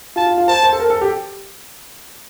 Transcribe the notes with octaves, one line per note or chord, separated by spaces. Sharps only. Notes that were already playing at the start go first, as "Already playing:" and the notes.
F4 A5
F4
F4
C5 A5
C5
A4
A#4
A4
G4